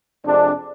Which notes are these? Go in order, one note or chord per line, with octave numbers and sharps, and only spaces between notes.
F2 C3 G#3 D4